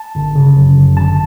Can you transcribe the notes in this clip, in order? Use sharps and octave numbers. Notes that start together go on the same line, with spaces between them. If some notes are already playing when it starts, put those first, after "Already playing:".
Already playing: A5
G1
C#3
F#2
G1
G1 A5